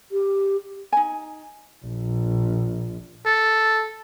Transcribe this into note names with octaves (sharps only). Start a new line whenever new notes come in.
G4
D#4 G#5
A#1
A4